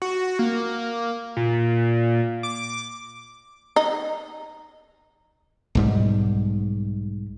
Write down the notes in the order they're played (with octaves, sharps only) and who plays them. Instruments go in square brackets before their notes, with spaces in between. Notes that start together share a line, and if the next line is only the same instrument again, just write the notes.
[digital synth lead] F#4
A#3
A#2
D6
[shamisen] D#4
[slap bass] B1 G#2 G3